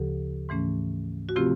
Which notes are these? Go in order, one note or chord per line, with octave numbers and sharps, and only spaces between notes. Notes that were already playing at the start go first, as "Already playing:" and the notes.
Already playing: D2 C#3 F3 G4 A4
G#2 E3 A3 C#4
F#4
C3 F3 A3 C4 F4 G4